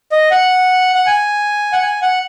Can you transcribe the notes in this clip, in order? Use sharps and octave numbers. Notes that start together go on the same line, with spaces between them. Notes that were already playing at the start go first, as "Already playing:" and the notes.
D#5
F#5
F#5
G#5
F#5
G#5
F#5